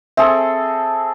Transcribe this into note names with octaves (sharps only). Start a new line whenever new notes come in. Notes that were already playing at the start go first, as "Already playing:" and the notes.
C4 G#4 A4 E5